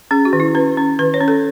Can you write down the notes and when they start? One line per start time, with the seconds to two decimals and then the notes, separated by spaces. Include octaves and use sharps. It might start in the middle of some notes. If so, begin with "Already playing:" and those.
0.11 C#4 G#4
0.25 F#4
0.33 D#3
0.40 E4
0.55 C#4 B4
0.77 C#4
0.99 D#3 B4
1.14 C#5
1.21 C#4
1.28 A4